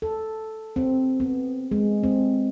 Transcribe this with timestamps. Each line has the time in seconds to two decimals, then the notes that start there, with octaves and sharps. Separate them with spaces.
0.02 A4
0.76 C4
1.20 B3
1.71 G#3
2.03 C4